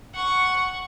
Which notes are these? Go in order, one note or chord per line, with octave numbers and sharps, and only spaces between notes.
F#5 C#6